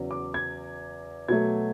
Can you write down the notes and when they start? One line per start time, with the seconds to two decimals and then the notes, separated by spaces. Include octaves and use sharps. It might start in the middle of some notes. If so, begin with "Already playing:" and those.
Already playing: E2 C#3 F#3
0.11 D6
0.34 G#6
1.28 B2 F#3 A3 G#6